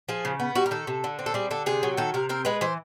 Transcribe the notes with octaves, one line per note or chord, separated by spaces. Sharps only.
F3 G#4
C#3
B3
G3 F#4
A#4
D#3 A4
C3
D3
C4
A4
G3 G#4
D3 A4
C3 G#4
F#3
D#3 A4
C3 A#4
C4 A#4
G#3 B4
E3 C5